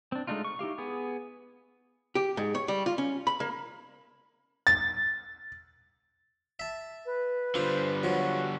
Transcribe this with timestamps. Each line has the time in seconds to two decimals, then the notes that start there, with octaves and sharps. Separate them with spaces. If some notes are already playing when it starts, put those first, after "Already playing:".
0.12 C4 D4
0.27 G#3 A3 D4 D#4 F4
0.45 C#6
0.59 D#4 E4 G4 F5
0.78 B3 G#4
2.15 G4
2.37 G#2
2.55 C#5
2.68 G3
2.86 F4
2.98 C#4
3.27 B5
3.40 A#3
4.67 A6
6.59 E5 A5
7.06 B4
7.55 D3 G3 F4 C5
8.03 F3 F#3 F#4